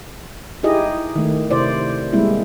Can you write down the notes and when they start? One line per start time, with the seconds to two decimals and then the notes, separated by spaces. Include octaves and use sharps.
0.63 D#4 E4 G4 G#4 D#5
1.15 D#3 A3
1.51 C3 E4 C5 D5
2.13 G3 G#3 A#3 C4 E4